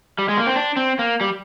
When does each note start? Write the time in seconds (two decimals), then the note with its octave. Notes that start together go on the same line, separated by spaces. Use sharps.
0.18 G3
0.29 G#3
0.38 A#3
0.47 C4
0.56 D4
0.77 C4
0.99 A#3
1.21 G3